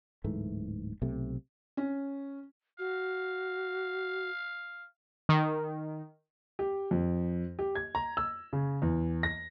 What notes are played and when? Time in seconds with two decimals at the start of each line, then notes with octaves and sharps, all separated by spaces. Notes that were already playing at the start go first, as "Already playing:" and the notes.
0.24 D1 G#2 E3 A3
1.02 B1 C3 A3
1.77 C#4
2.79 F#4 F5
5.29 D#3
6.59 G4
6.91 F2
7.59 G4
7.75 G#6
7.95 A#5
8.17 E6
8.53 C#3
8.82 E2
9.23 A#6